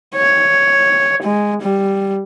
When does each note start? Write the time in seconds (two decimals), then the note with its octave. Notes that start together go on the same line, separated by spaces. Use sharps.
0.16 C#5
1.22 G#3
1.61 G3